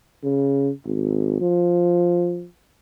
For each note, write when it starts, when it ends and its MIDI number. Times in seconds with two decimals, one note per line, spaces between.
0.24 0.71 49
0.86 1.38 32
1.41 2.47 53